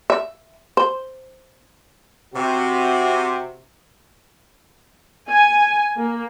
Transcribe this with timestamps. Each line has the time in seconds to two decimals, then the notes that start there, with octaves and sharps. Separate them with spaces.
0.10 E5
0.77 C5
2.35 C3 F#4
5.29 G#5
5.97 A#3